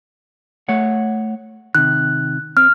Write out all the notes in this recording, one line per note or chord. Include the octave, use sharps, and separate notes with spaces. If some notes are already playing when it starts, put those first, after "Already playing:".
A3 C#5 F#5
C3 D#3 F#6
C4 F6